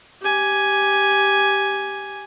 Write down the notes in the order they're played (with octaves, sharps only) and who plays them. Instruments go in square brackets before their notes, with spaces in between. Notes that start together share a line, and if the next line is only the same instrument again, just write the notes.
[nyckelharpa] G4 G#5